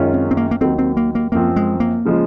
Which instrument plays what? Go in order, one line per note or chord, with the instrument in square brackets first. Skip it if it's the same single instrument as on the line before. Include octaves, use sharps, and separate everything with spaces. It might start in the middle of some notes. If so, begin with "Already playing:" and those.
Already playing: [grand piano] F#2 D#3 G#3 C#4 F4
[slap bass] C4
C4
A#3
A#3
[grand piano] D#2 D#3 F#3 [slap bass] C4
[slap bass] C4
A#3
A#3
[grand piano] F#2 F3 C4 [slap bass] A#3
[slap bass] G#3
A#3
[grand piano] C#3 F3 G#3